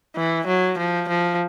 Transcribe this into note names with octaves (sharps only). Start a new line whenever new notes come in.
E3
F#3
F3
F3